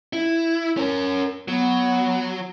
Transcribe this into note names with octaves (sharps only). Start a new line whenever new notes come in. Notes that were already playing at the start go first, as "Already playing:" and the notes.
E4
C#4 A#4
F#3 B3